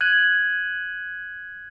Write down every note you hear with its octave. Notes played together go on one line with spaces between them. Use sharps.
F#6 G#6 D#7 F#7